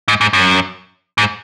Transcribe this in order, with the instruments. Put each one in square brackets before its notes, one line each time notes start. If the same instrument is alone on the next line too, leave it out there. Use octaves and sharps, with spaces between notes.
[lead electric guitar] G#2
G#2
F#2
G#2